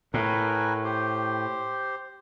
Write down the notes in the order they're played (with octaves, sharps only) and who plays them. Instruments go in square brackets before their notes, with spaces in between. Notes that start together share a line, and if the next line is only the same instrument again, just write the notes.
[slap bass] A2 [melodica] A#4 B4 G#5
[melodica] G4 C5